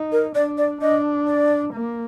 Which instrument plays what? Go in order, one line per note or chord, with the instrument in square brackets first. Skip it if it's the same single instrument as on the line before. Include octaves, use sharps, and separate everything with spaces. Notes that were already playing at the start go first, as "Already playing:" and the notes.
Already playing: [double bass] D#4
[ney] A#4
[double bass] D4 [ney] D5
[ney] D5
[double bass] D4 [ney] D#5
[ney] D5
[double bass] A#3